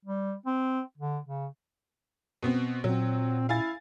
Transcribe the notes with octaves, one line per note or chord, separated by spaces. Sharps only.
G3
C4
D3
C#3
B2 B3 C4
A#2 F#3 C4
E4 F5 G#5 A6